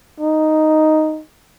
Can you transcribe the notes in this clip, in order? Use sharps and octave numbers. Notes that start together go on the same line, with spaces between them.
D#4